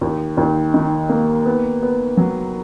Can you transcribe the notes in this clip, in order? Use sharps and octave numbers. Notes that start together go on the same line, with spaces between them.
D#2
D#2
D#3
A#3
B3
B3
F#3